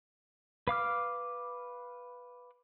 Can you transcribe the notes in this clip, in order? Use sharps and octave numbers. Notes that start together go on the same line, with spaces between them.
B4 F5 D6 F6